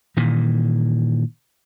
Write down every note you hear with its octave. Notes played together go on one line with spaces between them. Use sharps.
A#2 D#3 E3